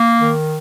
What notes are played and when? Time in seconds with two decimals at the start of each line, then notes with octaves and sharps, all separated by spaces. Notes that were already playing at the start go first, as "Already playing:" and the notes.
Already playing: A#3
0.19 D#3